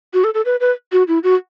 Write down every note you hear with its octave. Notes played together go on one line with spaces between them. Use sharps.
F#4
A4
A4
B4
B4
F#4
E4
F#4